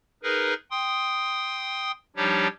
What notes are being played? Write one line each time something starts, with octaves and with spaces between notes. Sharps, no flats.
D#4 G#4 A#4 B4
G5 C6 D#6
F3 G3 D4 D#4 G4 C#5